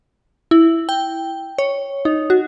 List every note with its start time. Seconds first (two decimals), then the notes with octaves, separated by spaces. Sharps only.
0.51 E4
0.89 G5
1.58 C#5
2.05 D#4
2.30 F#4